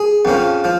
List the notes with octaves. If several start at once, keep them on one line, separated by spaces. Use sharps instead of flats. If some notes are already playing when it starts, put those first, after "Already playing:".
Already playing: G#4
F2 C#3 F3
F3